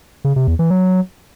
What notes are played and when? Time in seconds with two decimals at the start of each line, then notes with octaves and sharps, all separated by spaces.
0.25 C#3
0.36 C3
0.48 E2
0.59 E3
0.71 F#3